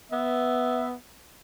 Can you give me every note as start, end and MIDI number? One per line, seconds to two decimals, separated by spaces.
0.12 0.92 59
0.12 0.92 76